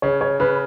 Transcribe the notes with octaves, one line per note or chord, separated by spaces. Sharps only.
C#3 C#5
C#5
C#3 B4